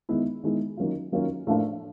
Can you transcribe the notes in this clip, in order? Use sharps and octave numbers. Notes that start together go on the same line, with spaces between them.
D#3 G#3 B3 E4
D#3 G#3 B3 E4
D#3 F#3 A#3 C#4 F4
D#3 F#3 A#3 C#4 F4
A2 F3 A#3 D4 F4